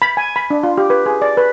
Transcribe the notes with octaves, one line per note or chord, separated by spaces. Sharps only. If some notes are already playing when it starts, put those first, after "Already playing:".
B5
G#5
B5
D4
F4
G4
B4
G#4
D5
B4